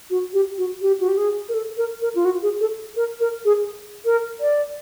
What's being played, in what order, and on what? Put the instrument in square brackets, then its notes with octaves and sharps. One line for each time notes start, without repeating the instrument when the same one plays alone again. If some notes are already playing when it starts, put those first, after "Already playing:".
[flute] F#4
G4
F#4
G4
F#4
G4
G#4
A#4
A4
A#4
A#4
F4
F#4
G#4
A4
A#4
A#4
G#4
A#4
D5